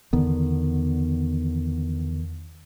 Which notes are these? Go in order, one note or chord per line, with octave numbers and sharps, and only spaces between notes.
E2 D3 D#3 B3